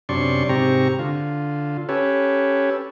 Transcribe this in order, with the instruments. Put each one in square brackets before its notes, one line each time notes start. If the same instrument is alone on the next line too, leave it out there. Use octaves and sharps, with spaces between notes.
[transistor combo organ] F#2 C3 D4 D5 C6 C#6
G#2 C3 C4 G4 A#5 C#6
D3 F4
C#4 G4 A4 B4 C#5